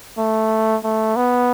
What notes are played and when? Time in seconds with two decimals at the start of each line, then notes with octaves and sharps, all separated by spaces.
0.18 A3
0.84 A3
1.16 B3